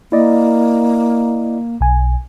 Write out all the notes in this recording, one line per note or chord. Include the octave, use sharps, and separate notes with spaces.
A#3 E4 D5 D#5
B1 G#5